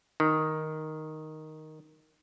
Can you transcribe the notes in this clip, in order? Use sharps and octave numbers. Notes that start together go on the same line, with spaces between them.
D#3